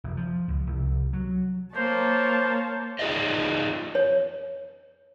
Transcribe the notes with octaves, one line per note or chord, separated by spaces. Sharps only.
F1
F3
C#2
C2
F#3
A#3 C5 C#5 A5
D#4 F4 G#4 B4 D5 D#5
C#5